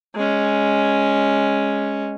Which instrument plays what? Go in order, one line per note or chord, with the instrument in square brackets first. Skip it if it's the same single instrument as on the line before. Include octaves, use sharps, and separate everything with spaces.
[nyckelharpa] G#3 C#4